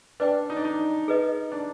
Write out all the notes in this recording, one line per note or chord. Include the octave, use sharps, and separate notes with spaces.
D4 B4 D5 G5
D#4
D4
D#4
G#4 B4 D#5
D4